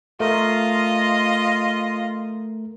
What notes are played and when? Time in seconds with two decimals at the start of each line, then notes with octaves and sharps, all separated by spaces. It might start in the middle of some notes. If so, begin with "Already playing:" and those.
0.20 A3 F4 A#4 D#5